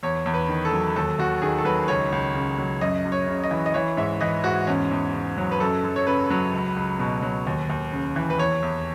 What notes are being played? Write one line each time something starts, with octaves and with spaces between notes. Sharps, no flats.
E2 C#5
E2
B4
D#3
A4
F#3
D#2 A4
D#2 F#4
D#3 G#4
A4
F#3 B4
C#2 C#5
C#2
C#3
F#3
F#2 D#5
F#2
C#5
C#3
D#5
E3
D#5
E3 C#5
G#2 E5
E3 D#5
G#2 F#4
E2 C#4
E2
C#3
F#3
B4
F#2 A4
F#2
C#5
C#3 B4
F#3
C#2
C#2
B2
F#3
D#2
D#2
C#3
E3
B4
E2 C#5
E2